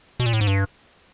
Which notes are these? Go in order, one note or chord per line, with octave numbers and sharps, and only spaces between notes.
B2
A#2
A2
G#2
G2